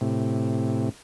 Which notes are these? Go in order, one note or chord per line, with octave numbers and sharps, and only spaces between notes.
A2 C3